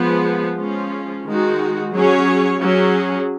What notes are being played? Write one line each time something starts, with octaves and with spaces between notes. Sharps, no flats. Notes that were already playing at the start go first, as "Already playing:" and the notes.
Already playing: F3 G#3 B3
F3 G#3 C#4 F4
D#3 G#3 D#4 F#4
F#3 C#4 G#4 C#5
F#3 C#4 G#4